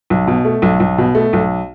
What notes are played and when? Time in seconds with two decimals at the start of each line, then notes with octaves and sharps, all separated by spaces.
0.10 B1
0.27 B2
0.45 A3
0.62 B1
0.80 B1
0.98 B2
1.15 A3
1.33 B1